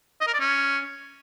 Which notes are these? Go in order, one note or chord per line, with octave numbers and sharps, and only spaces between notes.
D#5
A#4
D5
C#4